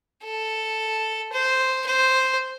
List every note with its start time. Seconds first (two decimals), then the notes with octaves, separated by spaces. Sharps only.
0.24 A4
1.33 C5
1.87 C5